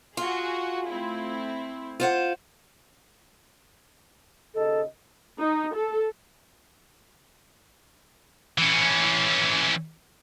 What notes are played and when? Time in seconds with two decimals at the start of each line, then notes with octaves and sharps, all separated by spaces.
0.17 F4 F#4 G#4
0.88 A3 C4 E4
2.00 F4 C5 F#5
4.54 D#2 C#3 A4 D#5
5.39 D#4
5.74 A4
8.58 E3 C#4